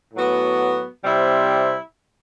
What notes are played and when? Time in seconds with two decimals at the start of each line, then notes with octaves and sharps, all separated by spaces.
0.14 A2 F#3 B3 F#4
1.04 C3 G3 C4 E4